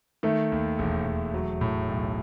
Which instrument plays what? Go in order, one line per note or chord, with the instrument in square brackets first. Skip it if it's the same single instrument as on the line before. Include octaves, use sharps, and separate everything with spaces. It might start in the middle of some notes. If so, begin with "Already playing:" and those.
[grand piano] D#3 [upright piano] A3
[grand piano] D#2
E1
E1
F#3
A2
B1